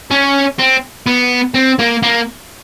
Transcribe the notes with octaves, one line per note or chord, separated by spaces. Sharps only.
C#4
C4
B3
C4
A#3
A#3